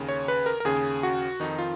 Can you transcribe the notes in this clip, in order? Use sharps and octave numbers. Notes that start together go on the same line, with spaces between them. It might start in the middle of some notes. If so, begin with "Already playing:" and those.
Already playing: D#2 C#3
C#5
B4
A#4
A#4
D#2 C#3 G#4
F#4
F2 D#3 D#4
F4